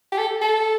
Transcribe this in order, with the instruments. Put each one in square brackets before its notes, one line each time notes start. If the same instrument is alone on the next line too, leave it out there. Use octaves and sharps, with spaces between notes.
[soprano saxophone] G4
A4
A4